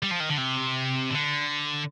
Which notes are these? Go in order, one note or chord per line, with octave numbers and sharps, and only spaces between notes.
G3
F3
D#3
D3
C3
D3